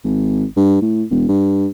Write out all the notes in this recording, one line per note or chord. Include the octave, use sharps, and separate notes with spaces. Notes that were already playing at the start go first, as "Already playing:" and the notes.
G#1
G2
A2
E1
G2